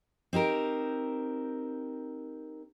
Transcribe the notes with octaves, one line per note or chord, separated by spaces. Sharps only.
C4 D#4 G4 A#4